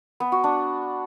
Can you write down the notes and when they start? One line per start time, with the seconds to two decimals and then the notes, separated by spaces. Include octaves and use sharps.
0.20 B3
0.32 F#4
0.44 D4